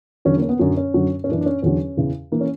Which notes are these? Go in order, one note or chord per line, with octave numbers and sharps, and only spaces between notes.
E2 D3 F#3 C#4
A#3
C#4
B3
F#2 D3 F#3
C#4
F#2 D3 F#3
C#4
F#2 E3 D4
D4
C#4
E2 D3 F#3 C#4
E2 C#3 E3
E3 A#3
C#4